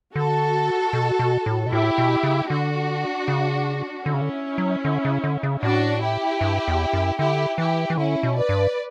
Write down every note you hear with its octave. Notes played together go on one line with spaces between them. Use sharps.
D3 F#4 A4
B2
B2
A2
B2
A2 E4 G4
B2
C#3
D3 D4 F#4
C#3
D3 C#4 E4
C#3
D3
F#3
D3
C#3
D3
C#3
A2 D4 F#4
E4 G4
G2
E2
F#2
D3 E4 G4
E3 E4 G4
E3
D3 C#4 E4
B2
B4 D5
G2